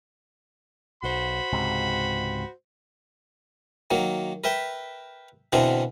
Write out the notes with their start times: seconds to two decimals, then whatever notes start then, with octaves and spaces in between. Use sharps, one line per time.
1.03 B1 F#4 C5 B5
1.53 C#2 G#2 C3
3.91 D#3 F#3 A#3
4.44 A#4 B4 E5 G5
5.52 B2 D3 E3 B3 C4 A#4